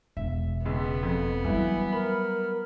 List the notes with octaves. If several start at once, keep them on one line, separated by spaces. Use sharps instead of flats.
E1 E5
C#2 B3
F2
E3 F#3 G3 E4
A#4 B5